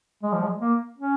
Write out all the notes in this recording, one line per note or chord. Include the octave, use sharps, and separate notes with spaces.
G#3
F3
G#3
A#3
C#4